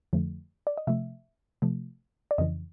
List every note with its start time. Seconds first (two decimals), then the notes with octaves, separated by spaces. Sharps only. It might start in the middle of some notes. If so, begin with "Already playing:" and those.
0.13 F2 D3 F3 A3
0.67 D5
0.77 D#5
0.87 C3 F3 A3 E5
1.62 C3 F3 A3
2.31 D5
2.38 F2 C#3 E3 D#5